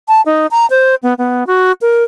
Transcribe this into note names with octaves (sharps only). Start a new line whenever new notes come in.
A5
D#4
A#5
C5
B3
B3
F#4
A#4